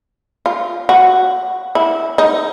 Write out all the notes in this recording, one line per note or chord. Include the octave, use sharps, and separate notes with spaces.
F4
F#4
E4
D#4